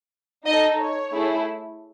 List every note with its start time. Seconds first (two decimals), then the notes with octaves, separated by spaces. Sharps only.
0.46 D#4 A4 D#5
0.79 C#5
1.12 A3 E4 G#4